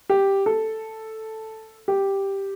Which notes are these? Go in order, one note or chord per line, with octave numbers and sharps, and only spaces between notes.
G4
A4
G4